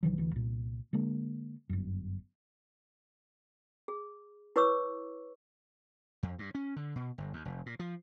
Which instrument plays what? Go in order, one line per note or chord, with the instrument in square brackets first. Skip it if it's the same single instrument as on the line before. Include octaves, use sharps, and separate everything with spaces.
[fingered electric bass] B1 D#3 E3 F#3
D2 E3
C2 A#2
D3 G#3 A#3
G1 F#2
[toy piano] G#4
E4 B4 C#5 C#6 D6 E6
[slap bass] F2
G2
C#4
D3
B2
G1
D#2
F1
A#2
F3